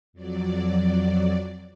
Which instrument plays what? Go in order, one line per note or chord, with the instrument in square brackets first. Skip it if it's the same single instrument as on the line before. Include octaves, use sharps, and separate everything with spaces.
[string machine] F2 F#3 D5